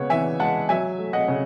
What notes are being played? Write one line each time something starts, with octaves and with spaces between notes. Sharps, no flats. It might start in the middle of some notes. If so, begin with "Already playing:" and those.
Already playing: C#3 G#3 B3 C#5 F#5
E3 E5 G#5
G#3 F#5 A5
F#3 E5 G#5
A3
D#5 F#5
C#3